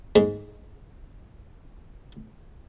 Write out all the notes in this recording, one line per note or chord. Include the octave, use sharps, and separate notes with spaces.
G#2 G#3